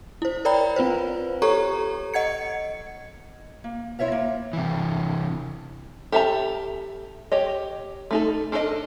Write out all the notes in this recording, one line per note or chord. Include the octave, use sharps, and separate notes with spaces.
E4 C5
A#4 C#5 D5 G5 A#5 B5
C4 F4 B4 C5
G4 A4 C#5 A#5 C#6
D#5 F#5 G#6 C#7
A#3
E4 F4 C#5 E5 F5
A#3
C3 E3
G4 A4 E5 A5 A#5
G4 C#5 D#5
A3 D#4 A4
D4 A4 A#4 C5 D#5